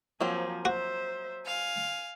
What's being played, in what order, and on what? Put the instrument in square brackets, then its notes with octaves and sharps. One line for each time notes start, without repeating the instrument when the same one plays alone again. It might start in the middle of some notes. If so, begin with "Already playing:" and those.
[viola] F3 G#5 [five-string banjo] F#3 A#3 C4
[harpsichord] F#4 [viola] C5 E5
[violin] F5 [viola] G#5